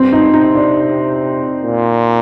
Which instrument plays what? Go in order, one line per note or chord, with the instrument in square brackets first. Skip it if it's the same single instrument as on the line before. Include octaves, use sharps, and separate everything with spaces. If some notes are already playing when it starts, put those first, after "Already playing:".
Already playing: [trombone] G2 [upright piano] C4
[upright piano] D#4
[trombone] C3 [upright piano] D#4
[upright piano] D4
[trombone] A#2